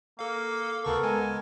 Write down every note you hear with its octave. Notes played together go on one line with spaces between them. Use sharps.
A#3 A4 F5
D2 C#3 B3 A4 A#4 C#6
G#3 G#5